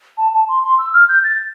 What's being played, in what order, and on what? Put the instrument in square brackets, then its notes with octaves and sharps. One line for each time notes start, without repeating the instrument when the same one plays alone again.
[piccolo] A5
A5
C6
C6
E6
F6
G6
A6